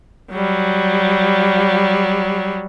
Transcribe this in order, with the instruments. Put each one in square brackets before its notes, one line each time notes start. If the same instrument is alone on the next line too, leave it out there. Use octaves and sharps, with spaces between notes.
[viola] F#3 G3